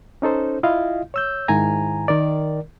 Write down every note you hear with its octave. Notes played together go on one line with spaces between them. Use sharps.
C#4 D#4 A4 C5
E4 F4 D#5 F5
C#5 E6 G6
G#2 D#3 E4 G#5 A#5
D#3 A#4 D5